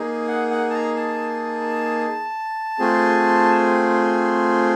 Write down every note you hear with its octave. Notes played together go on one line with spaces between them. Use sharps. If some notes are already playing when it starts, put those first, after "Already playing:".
Already playing: A#3 D#4 G#4
F#5
F#5
A5
A#5
A5
A3 C4 F4 G#4